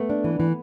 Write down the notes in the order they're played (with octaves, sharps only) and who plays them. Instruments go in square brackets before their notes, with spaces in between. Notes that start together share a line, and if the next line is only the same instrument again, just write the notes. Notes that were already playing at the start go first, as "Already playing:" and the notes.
Already playing: [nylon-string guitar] A3 [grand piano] B3
[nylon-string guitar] D4
E3
E3